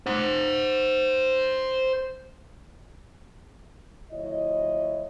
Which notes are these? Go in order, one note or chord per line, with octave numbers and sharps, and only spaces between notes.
C5 F#5
D2 F3 E4 C#5 D#5